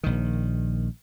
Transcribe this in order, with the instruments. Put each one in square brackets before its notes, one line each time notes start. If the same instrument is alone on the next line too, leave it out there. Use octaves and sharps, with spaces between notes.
[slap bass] A#1 D#3